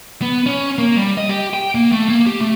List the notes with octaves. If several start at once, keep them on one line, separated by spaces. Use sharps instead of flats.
B3
C#4
A#3
G3
D#5
G4
G5
A#3
A3
A#3
G4
A3